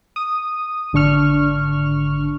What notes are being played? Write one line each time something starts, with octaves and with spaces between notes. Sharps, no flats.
D#6
G#1 D3 D4 C#6 F6